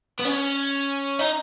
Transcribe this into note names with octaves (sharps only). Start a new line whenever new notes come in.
B3
C#4
D#4